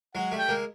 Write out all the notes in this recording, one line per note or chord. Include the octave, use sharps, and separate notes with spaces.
F#3 G#3 F#5
G3 A3
G5
G#3 A#3